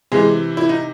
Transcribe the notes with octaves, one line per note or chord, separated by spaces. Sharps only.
C3 E3 G#3 G#4
E4
D#4